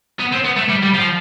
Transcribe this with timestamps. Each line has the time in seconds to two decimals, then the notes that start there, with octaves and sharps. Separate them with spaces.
0.20 B3
0.32 C4
0.45 B3
0.57 A3
0.69 G3
0.83 G3
0.94 F3